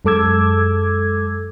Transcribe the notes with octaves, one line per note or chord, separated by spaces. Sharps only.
F#2 G#3 A4 D6 E6 G#6